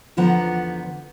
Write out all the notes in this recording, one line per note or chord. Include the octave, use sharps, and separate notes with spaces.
E2 D3 F3 B3 F#5 A#5